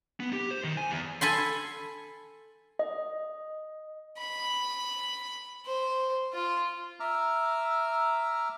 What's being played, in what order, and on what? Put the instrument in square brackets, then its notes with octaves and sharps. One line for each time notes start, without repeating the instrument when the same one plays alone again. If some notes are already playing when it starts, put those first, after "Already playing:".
[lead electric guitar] B3
G4
C5
D#3
G#5
E2
[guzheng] A4 G#5 B5 C6
[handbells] D#5
[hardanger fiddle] B5
C5
F4
[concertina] E5 A#5 D6 E6 F6